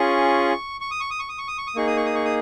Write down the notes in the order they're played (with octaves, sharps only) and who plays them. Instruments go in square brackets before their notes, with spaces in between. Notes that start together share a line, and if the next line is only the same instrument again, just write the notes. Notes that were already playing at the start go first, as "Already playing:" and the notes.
Already playing: [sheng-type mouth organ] C#4 F4 G#4 C#6
C#6
D#6
C#6
D#6
C#6
D#6
C#6
D#6
C#6
D#6
A#3 D#4 G#4 C#6
D#6
C#6
D#6
C#6
D#6